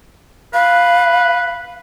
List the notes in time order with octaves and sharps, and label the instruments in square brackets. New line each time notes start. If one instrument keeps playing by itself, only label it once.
[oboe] B4 [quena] F5